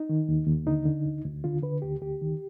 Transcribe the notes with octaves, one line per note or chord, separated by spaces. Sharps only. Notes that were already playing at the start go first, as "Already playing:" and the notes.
Already playing: D#4
D#3
D#2
D#2
D3 D#4
D3
D2
D2
D3 F4
D3 B4
D2 G4
D2 G4
D#3